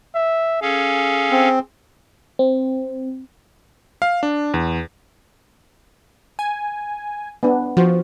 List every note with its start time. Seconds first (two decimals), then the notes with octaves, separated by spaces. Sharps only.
0.15 E5
0.62 C#4 G#4 A4 F5
1.31 C4
2.39 C4
4.02 F5
4.23 D4
4.54 E2
6.39 G#5
7.43 B3 D4
7.77 F3 F#4 C5